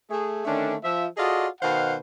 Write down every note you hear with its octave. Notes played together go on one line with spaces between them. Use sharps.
A3 G#4
D3 D#3 A3 C#4 D4
F3 E5
F4 F#4 G#4 A4 D5 D#5
B2 D#3 C5 F5 F#5